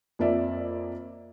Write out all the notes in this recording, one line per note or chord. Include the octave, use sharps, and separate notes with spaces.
F2 A#3 D5 E5